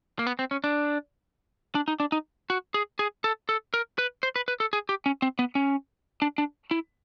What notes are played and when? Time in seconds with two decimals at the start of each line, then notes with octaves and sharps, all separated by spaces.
0.19 A#3
0.26 B3
0.39 C4
0.51 C#4
0.64 D4
1.75 D4
1.88 D#4
2.00 D4
2.12 D#4
2.50 F#4
2.74 G#4
2.99 G#4
3.24 A4
3.49 A4
3.74 A#4
3.98 B4
4.23 C5
4.36 B4
4.48 B4
4.60 A4
4.73 G#4
4.89 G4
5.06 C#4
5.22 C4
5.39 B3
5.55 C#4
6.22 D4
6.38 D4
6.71 E4